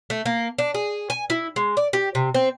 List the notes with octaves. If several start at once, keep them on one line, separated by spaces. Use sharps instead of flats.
A3
A#3
D4
G#4
G#5
E4
G#3
D5
G4
C3
C4